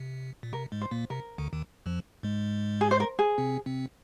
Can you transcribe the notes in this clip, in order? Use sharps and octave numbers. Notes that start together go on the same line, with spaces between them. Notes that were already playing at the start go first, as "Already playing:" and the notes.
Already playing: C3
A#2
C3 A#4
G#2 G#3
C5
A#2 A#3
C3 A#4
D2 D3
D#2 D#3
F2 F3
G#2 G#3
G#4
C5
A#4
G#4
C3 C4
C3 C4